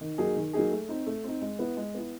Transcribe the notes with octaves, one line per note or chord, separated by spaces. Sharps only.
D#3
F#3 A#3 D#4 G#4
D#3
F#3 A#3 D#4 G#4
A3
C4 D#4
A3
C4 D#4
G#3
B3 E4
G#3
B3 E4